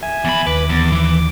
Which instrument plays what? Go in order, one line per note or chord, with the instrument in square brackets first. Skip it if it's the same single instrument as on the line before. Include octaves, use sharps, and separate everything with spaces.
[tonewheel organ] E5 G#5
[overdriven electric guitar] E2 B5
[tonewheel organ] D#2 D6 [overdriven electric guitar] B4
[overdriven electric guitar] E2
E3